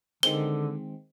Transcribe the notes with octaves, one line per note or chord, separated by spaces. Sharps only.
D3 D#3 G#3 C4 G7